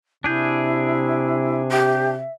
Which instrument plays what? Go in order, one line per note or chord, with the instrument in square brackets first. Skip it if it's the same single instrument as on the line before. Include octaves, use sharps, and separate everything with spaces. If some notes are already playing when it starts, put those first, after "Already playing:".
[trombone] C3 [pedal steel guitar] D4 G#4 G6 [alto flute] E4
[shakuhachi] G4 [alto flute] E5